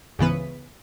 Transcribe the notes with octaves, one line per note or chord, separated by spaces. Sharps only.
C#2 G#2 C#3 E3 B3 B4